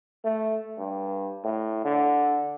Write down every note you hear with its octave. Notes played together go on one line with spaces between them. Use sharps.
A3
G2
A2
D3